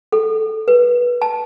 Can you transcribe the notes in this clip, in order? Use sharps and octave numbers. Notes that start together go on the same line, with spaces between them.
A4
B4
A5